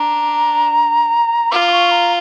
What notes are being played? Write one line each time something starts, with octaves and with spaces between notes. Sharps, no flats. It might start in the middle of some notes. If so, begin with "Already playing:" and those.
Already playing: D4 A#5
F4 D6
D6
C#6
A#5